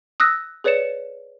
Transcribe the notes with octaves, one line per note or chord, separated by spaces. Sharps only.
D#6 E6 F#6 A#6
G#4 B4 C#5 D5 C#7 E7